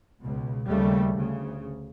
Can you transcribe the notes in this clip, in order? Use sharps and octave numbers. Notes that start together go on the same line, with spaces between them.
C#2 B2
D#2 C#3 G3 A3
D2 C#3